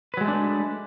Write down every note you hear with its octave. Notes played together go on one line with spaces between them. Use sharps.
F#3 G#3 A3 D4 B4